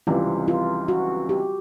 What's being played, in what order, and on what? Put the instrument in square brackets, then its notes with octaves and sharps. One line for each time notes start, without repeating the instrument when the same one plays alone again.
[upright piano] C#2 C3 E3 G3 C4 [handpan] F4
[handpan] F4
F#4
G4